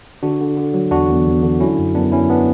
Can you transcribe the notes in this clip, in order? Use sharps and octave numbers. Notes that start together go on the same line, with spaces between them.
D3 D4 F#4
D3
D3
F#3
E2 D4 F#4
E2
E2
D3
F#3 C#4 E4
F#2
F#2 B3 D4
F#2 C#4 E4
B3 D4